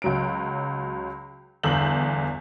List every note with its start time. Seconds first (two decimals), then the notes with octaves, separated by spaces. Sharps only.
0.02 C#2 F#3 D7
1.63 G1 E2 E6 G6 F#7